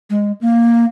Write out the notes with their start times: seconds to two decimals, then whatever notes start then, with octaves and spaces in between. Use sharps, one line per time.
0.10 G#3
0.41 A#3